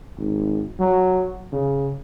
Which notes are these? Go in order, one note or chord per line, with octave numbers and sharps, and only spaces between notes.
G#1
F#3
C#3